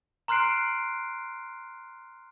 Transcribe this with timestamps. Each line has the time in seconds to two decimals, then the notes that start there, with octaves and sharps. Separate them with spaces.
0.28 A#5 C6 F6 F#6 C7 D7